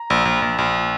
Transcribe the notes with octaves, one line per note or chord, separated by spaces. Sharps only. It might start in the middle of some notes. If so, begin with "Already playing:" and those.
Already playing: A#5
A#1
A#1
A#1
A#1